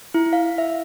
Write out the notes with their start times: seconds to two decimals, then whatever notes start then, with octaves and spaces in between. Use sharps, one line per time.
0.14 E4
0.33 F5
0.58 E5